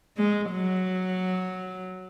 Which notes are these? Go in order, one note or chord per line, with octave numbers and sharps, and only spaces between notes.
G#3
F#3